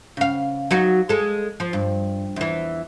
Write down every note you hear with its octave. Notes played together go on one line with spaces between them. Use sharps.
C#3 F5
F#3 D#4 F#4
G#3 A4
F3
G2
E2 E3